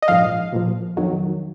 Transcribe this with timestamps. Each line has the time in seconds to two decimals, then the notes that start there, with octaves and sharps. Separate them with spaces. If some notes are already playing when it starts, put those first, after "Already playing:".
0.02 D#5
0.08 A#1 G#2 F3 F5
0.52 A#1 A#2 F3
0.97 F2 D#3 F#3